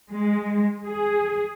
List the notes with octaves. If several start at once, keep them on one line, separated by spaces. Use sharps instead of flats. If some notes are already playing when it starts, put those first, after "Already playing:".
G#3
G#4